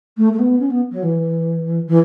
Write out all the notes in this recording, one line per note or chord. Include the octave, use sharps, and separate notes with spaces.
A3
A3
B3
C#4
B3
F#3
E3
E3